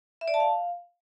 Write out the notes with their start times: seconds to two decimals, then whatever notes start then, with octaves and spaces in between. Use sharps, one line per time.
0.21 E5
0.28 D5
0.34 A5
0.40 F5